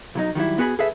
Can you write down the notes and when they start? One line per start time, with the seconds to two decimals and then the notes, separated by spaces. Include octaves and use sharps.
0.15 B1 F#3 D#4
0.35 D#3 F#3 G3 E4
0.58 B3 F#4 G#4 C#5 B5
0.79 G#4 A4 B4 E5